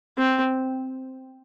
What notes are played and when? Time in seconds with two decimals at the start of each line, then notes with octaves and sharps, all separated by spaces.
0.18 C4